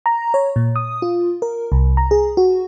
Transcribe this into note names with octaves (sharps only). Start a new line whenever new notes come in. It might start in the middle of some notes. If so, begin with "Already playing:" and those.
A#5
C#5
A#2
D#6
F4
A#4
C2
A#5
G#4
F#4